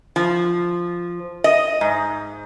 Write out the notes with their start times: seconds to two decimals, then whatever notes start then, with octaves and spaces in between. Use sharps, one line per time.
0.16 F3
1.44 D#5
1.81 G#2